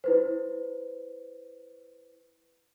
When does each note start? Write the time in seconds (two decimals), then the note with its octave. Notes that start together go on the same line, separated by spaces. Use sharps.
0.04 E4 B4 C5